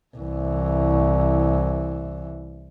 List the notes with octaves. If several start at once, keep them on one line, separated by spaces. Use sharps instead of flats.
C2 E3